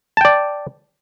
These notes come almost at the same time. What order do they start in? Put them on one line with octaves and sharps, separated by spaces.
A5 G5 D5